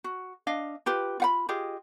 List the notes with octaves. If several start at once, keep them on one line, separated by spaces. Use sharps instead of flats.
F#4
D4 D#5 F5
F4 G4 B4
F4 F#5 B5
F4 G4 G#4 D#5